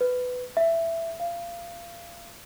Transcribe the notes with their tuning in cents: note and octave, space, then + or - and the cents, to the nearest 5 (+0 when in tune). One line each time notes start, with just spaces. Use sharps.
B4 +15
E5 +10
F5 -25